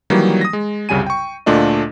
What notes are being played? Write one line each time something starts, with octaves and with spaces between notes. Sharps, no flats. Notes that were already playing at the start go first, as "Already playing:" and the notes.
D#3 E3 F#3 G3 A#3
D#6 A#6
G#3
C2 F#2 C#3 G3 G#5 D#7
G5 C#6
D2 A#2 A3 D4 F4 D#5